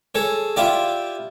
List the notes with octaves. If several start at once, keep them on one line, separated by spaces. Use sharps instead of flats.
G#4 A4 C#5
E4 F4 G4 D5